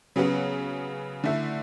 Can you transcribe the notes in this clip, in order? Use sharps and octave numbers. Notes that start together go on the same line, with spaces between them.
C#3 F#3 B3 F#4
D3 A3 E4